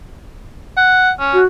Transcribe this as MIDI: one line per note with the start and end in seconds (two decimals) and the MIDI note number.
0.77 1.11 78
1.20 1.39 61
1.33 1.44 66